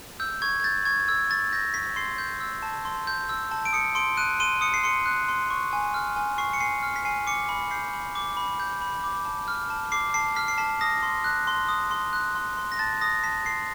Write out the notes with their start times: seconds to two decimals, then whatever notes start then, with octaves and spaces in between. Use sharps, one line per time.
0.20 E6 G6
0.42 C#6 G#6
0.60 G#6
0.64 G6 A6
0.85 C#6 G#6
1.08 E6 G#6
1.30 C#6 A6
1.53 G6 A#6
1.74 C#6 B6
1.96 C6 C7
2.18 G6
2.40 E6
2.63 A5
2.85 C6
3.07 G6
3.29 E6
3.51 A5
3.65 D7
3.73 D#6 C#7
3.95 C6 D7
4.17 F#6 D#7
4.40 C6 D#7
4.61 D#6 C#7
4.74 C7
4.84 C6 C#7
5.06 F#6
5.28 C6
5.50 C#6
5.73 G#5
5.94 F6
6.16 G#5
6.38 C#6 C7
6.53 C#7
6.60 G#5 C7
6.83 F6
6.96 B6
7.05 G#5 C7
7.27 D6 C#7
7.49 B5
7.71 G6 C7
7.93 B5
8.15 D6
8.37 B5
8.60 G6
8.81 B5
9.04 D6
9.25 A5
9.48 F6
9.70 A5
9.92 D6 C7
10.14 A5 C7
10.36 F6 B6
10.48 C7
10.58 A5 B6
10.81 D#6 A#6
11.03 C6
11.24 F#6
11.47 C6
11.69 D#6
11.91 C6
12.13 F#6
12.35 C6
12.57 C6
12.72 A#6
12.79 A5 A6
13.01 D#6 A#6
13.24 A5 B6
13.46 C6 C7